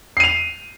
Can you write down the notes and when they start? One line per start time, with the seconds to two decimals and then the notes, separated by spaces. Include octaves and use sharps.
0.17 C7
0.20 D#7
0.24 F7